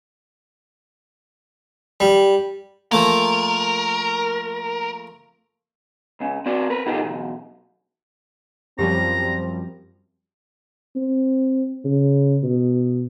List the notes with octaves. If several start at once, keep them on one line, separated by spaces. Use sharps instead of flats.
G3
F3 A3 A#3 A#4
C#2 C#3
C4 F#4 D5
A#4 B4
B2 D3 D#4 F4 G4 A4
B1 E2
F#2 F3 G3 C4 G4 A#5
C4
C#3
B2